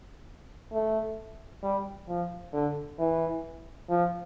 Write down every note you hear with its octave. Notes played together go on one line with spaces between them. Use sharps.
A3
G3
F3
D3
E3
F3